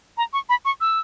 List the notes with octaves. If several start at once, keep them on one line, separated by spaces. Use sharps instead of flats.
A#5
C#6
B5
C#6
E6